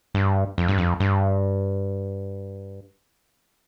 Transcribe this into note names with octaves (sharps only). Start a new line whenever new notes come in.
G2
F2
G2
F2
G2